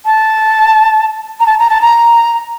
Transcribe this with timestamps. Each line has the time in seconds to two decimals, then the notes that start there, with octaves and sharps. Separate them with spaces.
0.06 A5
1.40 A#5
1.46 A5
1.59 A#5
1.70 A5
1.82 A#5